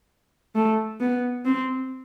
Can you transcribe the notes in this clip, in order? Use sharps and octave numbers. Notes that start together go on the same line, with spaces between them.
A3
B3
C4